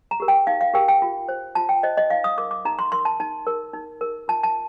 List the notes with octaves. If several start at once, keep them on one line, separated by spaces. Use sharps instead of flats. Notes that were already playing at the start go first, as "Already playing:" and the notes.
A#5
G4 A#4
G5
D#4 F5
F5
G4 A#4 G5
G5
F4
C5
F4 A5
G5
C5 D#5
D#5
D#4 F5
D#6
A#4 D6
D6
D#4 A#5
C6
A#4 C6
A5
D#4 A5
A#4
D#4
A#4
F4 A5
A5